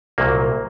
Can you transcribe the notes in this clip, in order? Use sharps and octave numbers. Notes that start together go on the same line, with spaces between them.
C2 A#2 F#3 A#3